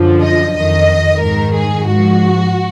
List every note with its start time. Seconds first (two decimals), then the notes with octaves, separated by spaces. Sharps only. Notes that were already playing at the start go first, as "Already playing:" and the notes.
Already playing: F#2 D3 F3
0.22 D#5
0.55 F2 D#3 D#5
1.21 G#2 D#3 A#4
1.54 G#4
1.88 G#2 F3 F#4